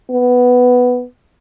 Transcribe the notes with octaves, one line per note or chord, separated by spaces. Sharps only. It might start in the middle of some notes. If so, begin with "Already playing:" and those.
B3